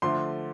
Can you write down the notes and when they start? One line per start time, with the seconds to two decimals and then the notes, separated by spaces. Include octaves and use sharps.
0.02 D3 F3 A3 C6